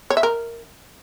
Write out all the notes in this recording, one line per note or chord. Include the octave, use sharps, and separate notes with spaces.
C#5
E5
A#4